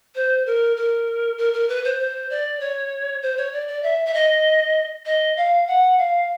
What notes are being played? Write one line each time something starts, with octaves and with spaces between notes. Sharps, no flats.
C5
A#4
A#4
A#4
A#4
B4
C5
C5
D5
C#5
C5
C#5
D5
D5
E5
E5
D#5
D#5
F5
F#5
F5